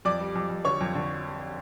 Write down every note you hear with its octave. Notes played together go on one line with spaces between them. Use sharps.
F2 D5 D6
G3
F2
F2
D3 C#5 C#6
F2
D3